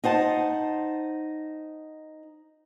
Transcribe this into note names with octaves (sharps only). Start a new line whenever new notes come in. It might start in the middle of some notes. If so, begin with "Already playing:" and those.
D#4 C5 F#5 A5